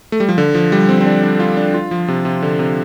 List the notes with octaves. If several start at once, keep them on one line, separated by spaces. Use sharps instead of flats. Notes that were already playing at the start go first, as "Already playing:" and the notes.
A3
G3
F3
D3
F3
G3
C4
C4
D4
D4
F4
D4
F4
F3
C3
C3
D3
C3